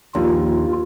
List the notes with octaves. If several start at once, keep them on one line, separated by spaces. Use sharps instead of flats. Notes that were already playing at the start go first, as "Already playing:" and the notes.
A#1 D#2 F4